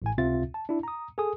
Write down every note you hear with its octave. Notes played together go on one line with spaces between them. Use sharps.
A1 A2 G#5
C#2 C3 C4 F4 E5 A6
A5
D4 E4
A#5 D#6
G#4 A4 G#5 D#6